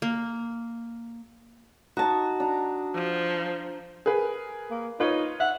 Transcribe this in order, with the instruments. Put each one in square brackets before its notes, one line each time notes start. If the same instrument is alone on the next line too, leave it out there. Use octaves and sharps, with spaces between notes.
[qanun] A#3
[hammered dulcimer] D#4 [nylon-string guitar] F#4 A5
[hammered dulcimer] D4 A#5
[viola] F3
[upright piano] G#4 A#4 B4
[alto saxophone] A#3
[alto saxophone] D#4 [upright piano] F4 B4 C#5
[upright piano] E5 [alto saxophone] F#5